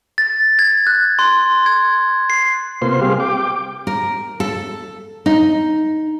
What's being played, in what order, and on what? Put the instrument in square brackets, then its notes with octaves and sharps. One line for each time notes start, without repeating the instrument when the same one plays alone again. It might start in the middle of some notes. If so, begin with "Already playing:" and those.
[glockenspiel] A6
G#6
F#6
C6
G#6
C7
[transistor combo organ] C3 A#3 B3 F4 C5 C6
G3 C4 G4 G#4 F5
G5 D6
[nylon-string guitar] A#4
A4
D#4